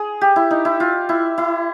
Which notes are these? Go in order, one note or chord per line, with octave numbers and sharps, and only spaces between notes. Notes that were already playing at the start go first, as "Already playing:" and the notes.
Already playing: G#4
G4
E4
D#4
E4
F4
E4
E4